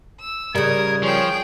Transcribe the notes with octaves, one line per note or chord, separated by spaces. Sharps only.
E6
C#3 G3 A#4 D#6 G#6
F3 G#4 C#5 G5